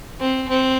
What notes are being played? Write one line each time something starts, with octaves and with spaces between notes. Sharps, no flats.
C4
C4